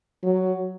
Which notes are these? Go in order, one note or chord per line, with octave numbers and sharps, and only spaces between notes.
F#3